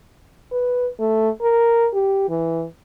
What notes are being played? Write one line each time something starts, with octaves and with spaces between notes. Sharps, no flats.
B4
A3
A#4
G4
E3